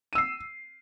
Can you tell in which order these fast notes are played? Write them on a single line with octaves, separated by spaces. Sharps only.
D#7 E6 C7